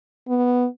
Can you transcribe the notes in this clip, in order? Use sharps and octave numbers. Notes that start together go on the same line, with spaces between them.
B3